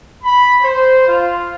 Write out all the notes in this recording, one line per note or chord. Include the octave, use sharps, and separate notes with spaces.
B5
C5
F4